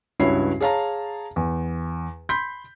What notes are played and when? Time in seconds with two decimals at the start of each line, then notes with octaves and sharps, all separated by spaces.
0.20 C#2 G2 E4 F#4 C#5 C7
0.60 G#4 C#5 F5 A5 A#5
1.36 E2
2.29 B5 C6 G6 B6